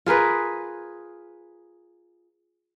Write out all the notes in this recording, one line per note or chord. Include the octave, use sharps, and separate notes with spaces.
F4 G#4 A#4 B4